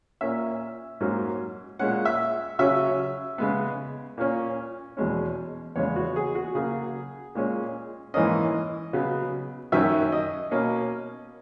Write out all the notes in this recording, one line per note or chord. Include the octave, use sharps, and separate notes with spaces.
A#2 A#3 C#4 E5
G#2 F#3 A#3 C#4
A#2 G#3 C#4 F#5
E5
C#3 F#3 C#4 E5
C#3 G#3 B3
A#2 A#3 C#4
E2 B2 G#3 C#4
E2 C#3 G#3 B3 C#5
F#4
G#4
F#4
C#3 F#3 A#3 G#4
A#2 G#3 C#4
G#2 E3 A#3 C#4 D#5
C#3 F#3 B3
F#2 D#3 F#3 C#4 E5
D#5
B2 A#3 C#4